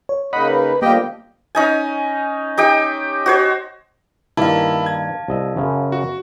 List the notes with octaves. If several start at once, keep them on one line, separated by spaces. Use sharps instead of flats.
C#5
C#3 A#3 D#4 D#5 F#5 B5
B4
D3 F3 G3 A#3 G4 D#5 F5 G5
C#4 D#4 G#5
D#4 G4 G5
F#4 C5 C#5
G2 D#3 A#3 E4 F5 A5
G#6
C2 D#5 E5
F#2 C#3
F#4